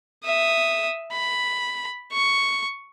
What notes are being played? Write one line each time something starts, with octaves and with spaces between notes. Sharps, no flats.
E5 D#6
B5
C#6